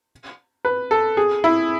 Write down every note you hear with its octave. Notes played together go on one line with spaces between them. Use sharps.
B4
A4
G#4
E4